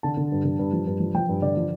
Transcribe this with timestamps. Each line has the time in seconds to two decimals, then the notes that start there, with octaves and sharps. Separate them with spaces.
0.03 D3 A5
0.17 D3
0.32 G2
0.45 D3
0.59 G2
0.73 F3
0.87 G2
1.00 F3
1.14 F3 G5
1.29 G2
1.42 D3 D5
1.57 F3